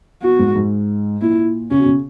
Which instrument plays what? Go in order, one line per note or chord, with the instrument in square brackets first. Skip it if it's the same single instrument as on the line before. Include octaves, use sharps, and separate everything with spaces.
[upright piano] B2 [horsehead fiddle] F#4
[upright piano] G#2
G#2
[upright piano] A#2 [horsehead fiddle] E4
[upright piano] C#3 [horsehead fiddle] C#4
[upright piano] B2
C#3